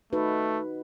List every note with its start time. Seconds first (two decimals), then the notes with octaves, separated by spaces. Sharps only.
0.13 A3 D#4 F#4 B4